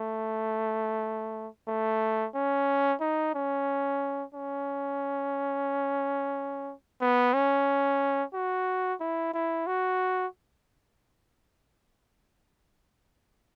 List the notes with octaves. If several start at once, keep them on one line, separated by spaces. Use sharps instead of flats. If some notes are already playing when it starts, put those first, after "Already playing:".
Already playing: A3
A3
C#4
D#4
C#4
C#4
B3
C#4
F#4
E4
E4
F#4